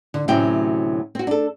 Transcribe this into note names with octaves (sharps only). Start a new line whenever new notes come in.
D3
D2 A2 C3 F#3 C#4 G5
C4 F#4
D4 A4